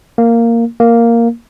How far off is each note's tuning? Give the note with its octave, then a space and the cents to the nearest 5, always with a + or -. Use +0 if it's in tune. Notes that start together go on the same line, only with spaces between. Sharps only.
A#3 -10
A#3 -5